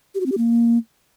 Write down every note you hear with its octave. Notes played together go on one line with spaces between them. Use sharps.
G4
F#4
C4
G4
A#3